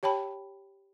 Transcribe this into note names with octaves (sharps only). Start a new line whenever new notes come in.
G4 C#5 G5 A5 B5